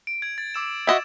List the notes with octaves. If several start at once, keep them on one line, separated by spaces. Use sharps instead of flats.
D7
G#6
A6
D6 E6 E7
F#4 D#5 E5 G#6 E7